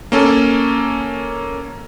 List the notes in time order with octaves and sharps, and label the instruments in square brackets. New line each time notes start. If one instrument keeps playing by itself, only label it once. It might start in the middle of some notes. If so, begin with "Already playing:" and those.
[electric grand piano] A#3 C#4 A4